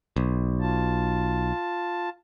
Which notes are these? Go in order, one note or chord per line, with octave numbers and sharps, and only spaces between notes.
B1
F4 A5